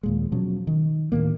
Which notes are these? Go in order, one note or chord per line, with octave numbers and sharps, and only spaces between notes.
D#2 A#2 G#3
B2 F3 F#3 C#4
D#3
D2 A2 D#3 A#3